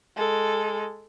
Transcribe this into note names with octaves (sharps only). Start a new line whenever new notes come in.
G#3 A4